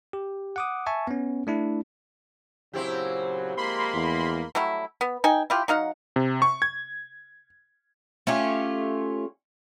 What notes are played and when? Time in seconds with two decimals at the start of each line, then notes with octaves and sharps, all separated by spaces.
0.13 G4
0.56 F#5 D6 D#6
0.87 E5 G#5 A5 C#6
1.07 B3 C#4
1.47 A3 D4 E4
2.73 A#2 C#3 F#3 C4 E4 G4
3.57 F3 G#3 A#3 B5 C6
3.94 E2
4.55 F#3 G3 A3 E4
5.01 B3
5.24 D#4 G5 G#5
5.50 E4 F4 G4
5.68 F#3 D#4 F5 F#5
6.16 C3
6.42 C#6
6.62 G#6
8.27 A3 C#4 F4 G4